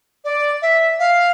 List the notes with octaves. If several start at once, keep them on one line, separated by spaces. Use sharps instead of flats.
D5
E5
F5